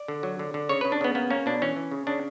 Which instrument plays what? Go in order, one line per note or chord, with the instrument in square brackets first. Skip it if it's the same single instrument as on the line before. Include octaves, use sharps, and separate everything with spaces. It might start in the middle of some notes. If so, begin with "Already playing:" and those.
Already playing: [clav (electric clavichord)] D5
D3
F#3
D3
D3
C#3 C#5
C#3 B4
D4
C#3 B3
A#3 B3
A#3 C#4
B2 D4
E3 C#4
E3
C#3
C#3 D4